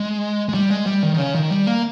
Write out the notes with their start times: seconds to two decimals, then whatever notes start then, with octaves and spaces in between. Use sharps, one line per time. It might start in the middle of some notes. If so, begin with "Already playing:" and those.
Already playing: G#3
0.49 G#3
0.54 G3
0.70 G#3
0.86 G3
1.03 D#3
1.14 D#3
1.18 C#3
1.35 D#3
1.50 G3
1.67 A#3